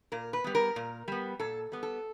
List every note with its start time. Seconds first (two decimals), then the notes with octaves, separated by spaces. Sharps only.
0.12 A#2 A#4
0.33 B4
0.44 G3 B3
0.55 A#4
0.76 A#2
1.08 G3 B3
1.40 A#2 A4
1.72 G3 B3
1.83 A4